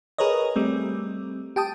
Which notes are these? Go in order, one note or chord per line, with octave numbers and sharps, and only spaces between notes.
G#4 A#4 B4 C#5 D#5
G3 A3 C4
G4 G5 A5 D#6